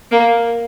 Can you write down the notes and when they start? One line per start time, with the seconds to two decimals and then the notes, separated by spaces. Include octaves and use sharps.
0.12 A#3